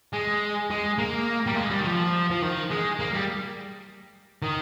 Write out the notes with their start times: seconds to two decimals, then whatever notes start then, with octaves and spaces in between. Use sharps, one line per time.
0.13 G#3
0.70 G#3
0.98 A#3
1.47 G3
1.56 G#3
1.70 G3
1.80 D#3
1.85 F3
2.31 F3
2.42 D#3
2.71 G#3
2.99 A#3
3.14 G3
4.43 D#3